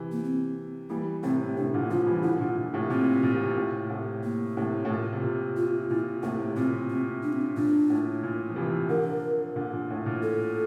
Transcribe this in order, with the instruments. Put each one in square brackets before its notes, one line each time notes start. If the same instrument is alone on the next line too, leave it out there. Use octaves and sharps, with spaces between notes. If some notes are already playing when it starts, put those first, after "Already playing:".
Already playing: [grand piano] C3 E3
[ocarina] A#3
C4
[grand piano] E3 G3 [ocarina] A#3
[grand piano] A2 C3 [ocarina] C4
[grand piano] A2 C3 [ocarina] D4
[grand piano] A#2 D3
[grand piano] D3 F3 [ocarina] F4
[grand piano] E3 G3
[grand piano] D3 F3 [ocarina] E4
[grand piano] A#2 D3
A#2
A2 C3
[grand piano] A#2 [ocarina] C4
[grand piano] A#2
C3
A#2
A2
A2 C3
[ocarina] A#3
[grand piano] A2 C3
A2
A#2
C3
A#2
[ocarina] F4
[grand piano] A#2 [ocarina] E4
[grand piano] A2 C3 [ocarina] A#3
[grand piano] C3
[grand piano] A#2 [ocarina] C4
[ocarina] C4
D4
C4
D4
[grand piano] A#2 [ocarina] D4
[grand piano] A2
A#2
F3
C3 E3
[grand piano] D3 F3 [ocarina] A#4
[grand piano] A#2 D3
A#2
A2
A#2
[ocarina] A4